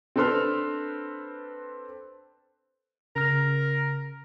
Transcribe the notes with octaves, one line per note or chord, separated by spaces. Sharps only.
C4 D4 A4 B4 C6 F6
C#3 A#4 F6